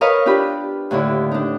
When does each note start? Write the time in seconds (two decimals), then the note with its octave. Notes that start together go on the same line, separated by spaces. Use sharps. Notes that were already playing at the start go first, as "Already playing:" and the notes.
0.01 A#4 B4 C#5 D#5 F5
0.26 D4 F4 G4 B5
0.91 D#2 A2 D3 E4
1.31 D4 D#4